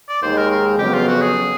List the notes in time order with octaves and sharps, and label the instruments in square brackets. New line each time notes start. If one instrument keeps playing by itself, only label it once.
[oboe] D5
[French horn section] D#2 D#3 G#3 [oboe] C5
[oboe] A#4
A#4
[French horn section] F2 C#3 F#3 B3 [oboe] G4
[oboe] F4
F#4
G#4